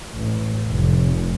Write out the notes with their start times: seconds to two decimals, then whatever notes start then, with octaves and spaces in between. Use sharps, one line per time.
0.13 A1
0.66 F1